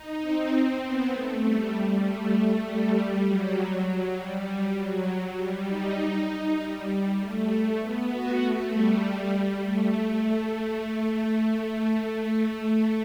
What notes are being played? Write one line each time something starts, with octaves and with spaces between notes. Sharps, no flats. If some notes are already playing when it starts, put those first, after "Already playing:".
Already playing: D#4
C4
B3
A3
G3
A3
G3
F#3
G3
F#3
G3
D#4
G3
A3
B3
F#4
A3
G3
G3
A3
A3
A3